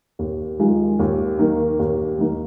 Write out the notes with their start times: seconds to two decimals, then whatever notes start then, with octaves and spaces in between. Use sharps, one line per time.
0.19 D#2
0.59 D#3 G#3 F4
0.99 D#2
1.39 D#3 A#3 D#4 A#4
1.79 D#2
2.19 D#3 A#3 D#4 A#4